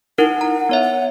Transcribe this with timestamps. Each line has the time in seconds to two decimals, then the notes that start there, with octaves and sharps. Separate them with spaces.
0.18 D#4 E4 A#4 F#5
0.41 A#5
0.69 B3 C#5 E5
0.82 F#5